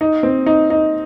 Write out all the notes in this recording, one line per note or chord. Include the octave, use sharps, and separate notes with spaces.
D#4
C4
D#4
D#4